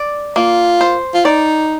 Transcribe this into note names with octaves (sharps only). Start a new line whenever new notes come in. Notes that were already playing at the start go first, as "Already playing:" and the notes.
Already playing: D5
A#3 F4
C5
F4
D#4 D5